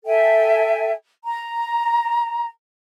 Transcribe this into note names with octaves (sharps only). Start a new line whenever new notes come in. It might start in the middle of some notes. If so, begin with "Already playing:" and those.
A4 E5 G5 G#5
A#5